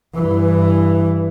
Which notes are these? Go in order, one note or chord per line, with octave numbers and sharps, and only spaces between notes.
G2 E3